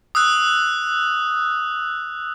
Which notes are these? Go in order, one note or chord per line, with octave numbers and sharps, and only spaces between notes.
D#6 E6 F#6